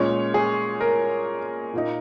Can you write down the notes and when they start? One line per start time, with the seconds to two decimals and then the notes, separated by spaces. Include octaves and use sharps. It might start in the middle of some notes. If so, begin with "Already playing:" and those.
Already playing: A#2 G#3 C#4 C#5
0.34 G#4
0.81 A#4
1.73 A#2 A#3 D#4